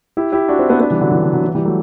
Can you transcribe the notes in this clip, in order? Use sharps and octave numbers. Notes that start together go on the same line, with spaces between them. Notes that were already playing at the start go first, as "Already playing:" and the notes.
E4 G4
E4 G4
D4 F#4
C4 E4
B3 D4
B3 D4
E3 G3
D3 F#3
E3
D3
D3 F#3
E3
E3 G3
F#3 A3